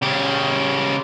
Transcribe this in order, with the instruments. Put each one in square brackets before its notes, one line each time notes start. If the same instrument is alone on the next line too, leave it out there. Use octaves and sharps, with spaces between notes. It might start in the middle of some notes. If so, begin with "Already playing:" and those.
[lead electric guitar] C#3 G4